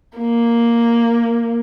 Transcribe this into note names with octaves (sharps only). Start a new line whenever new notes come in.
A#3